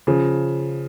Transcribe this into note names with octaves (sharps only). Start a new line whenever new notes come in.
C#3 F3